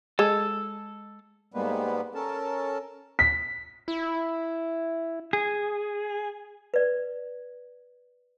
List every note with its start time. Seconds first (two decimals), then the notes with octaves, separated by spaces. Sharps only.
0.19 G#3 A4
1.54 G#2 G3 G#3 A#3 B3 B4
2.15 C#4 A4 A#4 A5
3.19 B6
3.88 E4
5.33 G#4
6.74 B4 D5